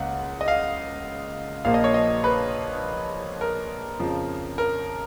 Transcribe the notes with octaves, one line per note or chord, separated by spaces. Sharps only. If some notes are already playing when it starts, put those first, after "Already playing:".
Already playing: C#2 C#3 A#3 F#5
D#5
F5
A#1 A#2 F3 A#3 F5
D#5
C#5
D#5
B4
A#4
F2 C#3 F3
A#4